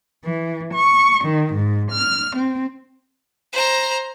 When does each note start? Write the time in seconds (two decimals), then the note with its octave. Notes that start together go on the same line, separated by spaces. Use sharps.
0.24 E3
0.74 C#6
1.25 D#3
1.54 G#2
1.91 F6
2.37 C4
3.53 C5 A#5